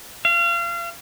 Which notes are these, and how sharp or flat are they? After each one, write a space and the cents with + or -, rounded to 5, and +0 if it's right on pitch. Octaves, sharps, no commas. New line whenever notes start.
F5 -30